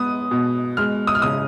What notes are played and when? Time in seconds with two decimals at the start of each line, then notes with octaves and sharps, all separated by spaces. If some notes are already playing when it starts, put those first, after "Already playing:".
Already playing: G#3 B3 D#6
0.31 B2
0.77 G#3 F6
1.07 D#6
1.15 F6
1.22 C#3 D#6